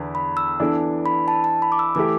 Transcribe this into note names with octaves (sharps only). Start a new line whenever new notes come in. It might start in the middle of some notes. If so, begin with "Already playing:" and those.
Already playing: E2 D3 B4
B5
E6
E3 B3 D4 A4
B5
A5
A5
B5
D6
E6
E3 A3 G4 D6